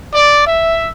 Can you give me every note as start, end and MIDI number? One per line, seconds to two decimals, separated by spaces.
0.13 0.45 74
0.47 0.92 76